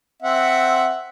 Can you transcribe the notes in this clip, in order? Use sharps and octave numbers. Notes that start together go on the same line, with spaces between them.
C4 E5 F#5